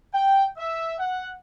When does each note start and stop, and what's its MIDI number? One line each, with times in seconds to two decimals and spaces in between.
0.13 0.44 79
0.57 0.93 76
0.99 1.31 78